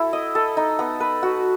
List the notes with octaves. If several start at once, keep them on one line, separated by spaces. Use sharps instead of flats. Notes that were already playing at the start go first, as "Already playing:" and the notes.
Already playing: E4 F#4 A4
D#5
A4
D#4
B3
B4
F#4